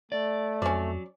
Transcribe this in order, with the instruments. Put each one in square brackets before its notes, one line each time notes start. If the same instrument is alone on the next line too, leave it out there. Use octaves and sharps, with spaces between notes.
[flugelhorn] A3 [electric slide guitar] D5
[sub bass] F2 [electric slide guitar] F#3 [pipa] C#4 D5